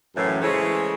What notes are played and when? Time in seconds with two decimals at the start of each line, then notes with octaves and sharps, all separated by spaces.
0.16 F#2 A2 E3
0.42 C#3 E3 G#3 A3 C5 C#5